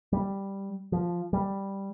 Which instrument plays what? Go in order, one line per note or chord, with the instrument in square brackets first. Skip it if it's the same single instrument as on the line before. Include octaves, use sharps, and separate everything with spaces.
[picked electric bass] G3
F3
G3